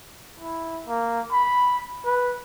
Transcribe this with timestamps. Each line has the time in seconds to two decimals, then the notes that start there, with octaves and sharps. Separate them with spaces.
0.40 E4
0.88 A#3
1.32 B5
2.05 B4